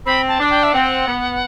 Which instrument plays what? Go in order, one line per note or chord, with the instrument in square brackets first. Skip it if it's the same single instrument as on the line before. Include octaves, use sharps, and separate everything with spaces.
[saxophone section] C4 [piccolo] B5
[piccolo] A5
[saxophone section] D4
[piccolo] G5
E5
[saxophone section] C4 [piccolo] F#5
[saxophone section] B3